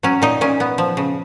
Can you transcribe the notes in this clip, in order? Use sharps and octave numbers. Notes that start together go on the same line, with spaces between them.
F#3 C#4
A#2 D#4
A#2 C#4
B3
F3
C#3